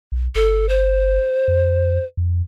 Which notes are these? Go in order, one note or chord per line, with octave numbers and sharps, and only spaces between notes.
B1
G1 A4
C5
F2
F2